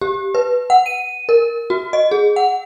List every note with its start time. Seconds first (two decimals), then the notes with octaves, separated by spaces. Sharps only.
0.01 G4
0.35 B4
0.70 F#5
0.86 D#7
1.29 A#4
1.70 F#4
1.93 D#5
2.11 G#4
2.36 F#5